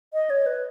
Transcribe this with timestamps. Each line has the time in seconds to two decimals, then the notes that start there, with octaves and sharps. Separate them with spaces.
0.13 D#5
0.30 C#5
0.46 B4